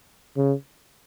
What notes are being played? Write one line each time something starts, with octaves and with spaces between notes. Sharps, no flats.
C#3